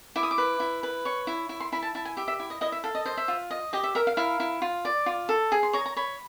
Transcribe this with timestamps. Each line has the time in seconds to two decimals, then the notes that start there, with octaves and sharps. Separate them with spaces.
0.16 E4 D6
0.23 D#6
0.31 D6
0.38 B4
0.60 E4
0.83 B4
1.05 C#5 C#6
1.27 E4
1.49 E4
1.60 C6
1.72 E4 B5
1.83 A5
1.95 E4 A5
2.05 G#5
2.17 G4 E5
2.28 E5
2.40 E4
2.50 D#5
2.61 E4 D#5
2.72 E5
2.84 A4 F5
2.95 D#5
3.06 C5 D#5
3.17 E5
3.28 F4
3.51 D#5
3.73 G4 D#5
3.83 E5
3.95 A#4 E5
4.07 F5
4.17 E4 F5
4.40 E4
4.62 F4
4.85 D5
5.06 F4
5.29 A4
5.52 G#4 G#5
5.63 C6
5.73 C#5 A#5
5.86 A#5
5.97 C#5 B5